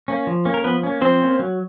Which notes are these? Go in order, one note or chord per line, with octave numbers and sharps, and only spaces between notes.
A#3 C#4
F3
A#3 C#4
A#4
F3 B3 B4
A#3 C#4
F3 C4 C5
A#3 C#4
F#3